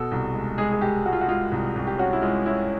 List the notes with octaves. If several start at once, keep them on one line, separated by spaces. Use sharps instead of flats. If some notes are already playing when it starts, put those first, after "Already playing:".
Already playing: B2 A4
C2
G#3
G#3 G#4
G#4
G#3 G4
G#3 F#4
F4
F#4
G#3 F4
C2
C2
G4
C#4 F#4
E4
G#3 F4
C#4 E4